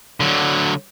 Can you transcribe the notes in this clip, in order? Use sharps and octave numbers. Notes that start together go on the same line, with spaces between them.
D3 F#3